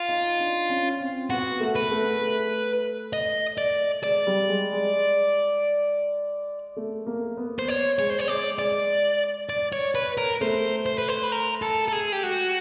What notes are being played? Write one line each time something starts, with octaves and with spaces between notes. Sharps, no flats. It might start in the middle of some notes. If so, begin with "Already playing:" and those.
Already playing: F4
D#4
D4
C#4
C4
B3 F#4
A3
B4
A3
A3
D#5
D5
G#3 D5
G3
G#3
G#3
A3
A#3
B3
C5
C#5
G#3 C#5
C5
C#5
G#3 D5
G#3 D5
D5
C#5
B4
A#4
A3 C5
C5
B4
C5
B4
A#4
A4
A4
G#4
G4
G#3 F#4